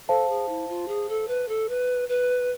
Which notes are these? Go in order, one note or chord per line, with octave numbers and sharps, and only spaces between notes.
A4 C5 F5 A5
G#4
E4
F4
G#4
A4
B4
A4
B4
B4